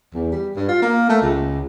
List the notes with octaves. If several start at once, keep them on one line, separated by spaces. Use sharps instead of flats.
E2
G3
G2
F4
A#3
A3
C#2